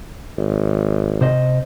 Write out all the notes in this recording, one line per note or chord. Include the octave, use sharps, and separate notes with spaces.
G#1
C3 C5 D#5